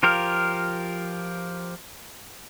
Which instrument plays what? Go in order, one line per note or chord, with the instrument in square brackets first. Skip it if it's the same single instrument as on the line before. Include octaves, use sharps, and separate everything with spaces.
[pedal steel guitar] F3 F4 G4 A#4